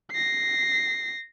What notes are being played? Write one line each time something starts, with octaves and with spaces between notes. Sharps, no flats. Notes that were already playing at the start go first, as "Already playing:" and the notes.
A#6 C7